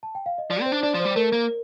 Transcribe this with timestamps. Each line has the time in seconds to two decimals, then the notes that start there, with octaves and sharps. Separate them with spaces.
0.03 A5
0.15 G5
0.26 F5
0.38 D#5
0.50 F3 D5
0.61 C4 C5
0.72 D4
0.83 D4 D5
0.94 F3
1.00 C5
1.05 G3
1.16 A3 A#4
1.32 A#3